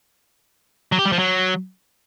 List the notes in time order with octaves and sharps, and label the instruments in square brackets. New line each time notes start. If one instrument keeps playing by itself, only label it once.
[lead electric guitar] F#3
G4
G3
F3
F#3